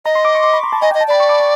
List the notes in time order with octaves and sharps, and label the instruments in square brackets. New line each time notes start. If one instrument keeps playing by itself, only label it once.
[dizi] D#5 [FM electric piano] A#5
[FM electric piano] C6
D6
C#6
C6
B5
A#5
A5
[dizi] D#5 [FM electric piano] G#5
[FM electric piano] G5
[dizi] D#5
[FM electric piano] A5
[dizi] D5 [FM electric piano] B5
[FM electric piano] C#6
D6
A5